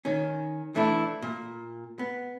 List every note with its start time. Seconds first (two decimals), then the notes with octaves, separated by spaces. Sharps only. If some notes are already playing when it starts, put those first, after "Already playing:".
0.05 D#3 C#4
0.75 E3 A3 D4 E4
1.22 A#2
1.99 B3